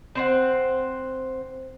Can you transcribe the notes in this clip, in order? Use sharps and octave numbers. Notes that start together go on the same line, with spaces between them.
C4 C5 F#5